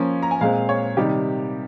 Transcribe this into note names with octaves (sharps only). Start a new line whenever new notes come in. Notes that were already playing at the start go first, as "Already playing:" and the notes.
Already playing: F3 A#3 C#4
A#5
G#5
A#2 G#3 C4 F5
C#5
C3 D#3 G3 G4